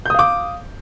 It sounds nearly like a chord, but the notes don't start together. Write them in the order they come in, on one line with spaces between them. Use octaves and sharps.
G6 D#6 F5 D6